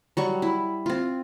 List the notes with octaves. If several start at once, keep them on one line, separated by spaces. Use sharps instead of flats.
F#3 G3 C#6
E4
C4 F4